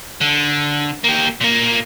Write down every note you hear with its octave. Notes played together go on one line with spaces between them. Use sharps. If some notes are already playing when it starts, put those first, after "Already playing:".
D3
A#3 G4
A#2 A#3